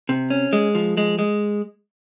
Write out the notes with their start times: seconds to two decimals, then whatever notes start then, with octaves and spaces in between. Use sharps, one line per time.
0.09 C3
0.30 C#4
0.53 G#3
0.75 F3
0.97 G#3
1.19 G#3